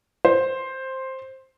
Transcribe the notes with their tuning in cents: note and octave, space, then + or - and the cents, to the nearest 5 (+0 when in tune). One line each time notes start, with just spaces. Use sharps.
C5 +10